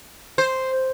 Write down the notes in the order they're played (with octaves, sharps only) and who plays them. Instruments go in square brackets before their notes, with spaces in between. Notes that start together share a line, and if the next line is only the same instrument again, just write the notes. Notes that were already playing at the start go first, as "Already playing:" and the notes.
[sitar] C5